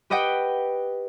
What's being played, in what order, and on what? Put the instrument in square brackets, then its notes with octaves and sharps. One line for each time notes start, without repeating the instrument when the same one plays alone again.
[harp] G4 B4 D#5 F#5 G5